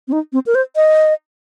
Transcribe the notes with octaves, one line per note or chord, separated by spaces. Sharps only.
C4
D#4
C4
A#4
C5
D#5